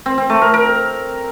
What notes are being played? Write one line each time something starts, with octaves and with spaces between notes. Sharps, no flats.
C4
C4
A3
A#4
A#4